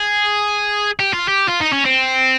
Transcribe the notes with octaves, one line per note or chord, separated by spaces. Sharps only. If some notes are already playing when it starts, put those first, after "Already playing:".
Already playing: G#4
G4
F4
G4
F4
D#4
C#4
C4